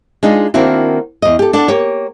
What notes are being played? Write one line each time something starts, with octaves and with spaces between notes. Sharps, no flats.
G#3 D4 D#4 F4
D#3 A#3 C4 D4 E4 F#4
E2 D#5
G4 A4
D4 A4 F#5
A#3 G4 C#5